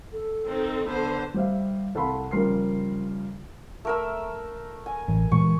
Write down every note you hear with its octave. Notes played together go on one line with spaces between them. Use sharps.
A4
D#3 C4 D#4
D3 B3 C5
G3 G4 C5 E5 F5
C2 A4 F5 F#5 B5 C6
C#3 F3 G3 A#4 C6 C7
A3 A#4 E6
G#5
A1
A#2 E3 G#3 C#6